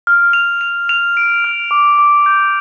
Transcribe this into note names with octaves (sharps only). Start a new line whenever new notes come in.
F6
F7
F7
F7
D7
F6
D6
D6
G6